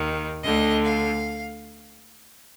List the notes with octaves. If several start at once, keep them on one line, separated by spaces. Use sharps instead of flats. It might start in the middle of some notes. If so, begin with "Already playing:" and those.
Already playing: D#2 D#3
D2 D3 D#5
F5